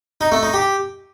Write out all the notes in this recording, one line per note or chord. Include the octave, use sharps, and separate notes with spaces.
D#4
A3
D#4
G4